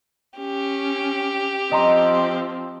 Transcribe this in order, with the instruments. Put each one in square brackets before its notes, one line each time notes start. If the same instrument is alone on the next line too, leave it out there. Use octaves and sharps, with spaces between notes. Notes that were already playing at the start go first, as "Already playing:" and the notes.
[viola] C#4 [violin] G4
[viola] F3 C4 [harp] D#5 A#5 C6